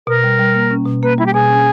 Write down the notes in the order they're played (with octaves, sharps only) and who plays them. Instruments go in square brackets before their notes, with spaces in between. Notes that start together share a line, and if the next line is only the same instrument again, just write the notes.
[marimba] B2 [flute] A#4
[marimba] G3
G3
A#3
C#4
B2
[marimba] A#3 [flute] B4
[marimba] G3 [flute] E4
[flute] G4
[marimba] B2 [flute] G#4
[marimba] C#4